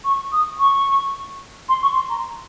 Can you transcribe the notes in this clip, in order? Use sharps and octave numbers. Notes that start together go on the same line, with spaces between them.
C#6
D#6
C#6
C6
C#6
C6
A#5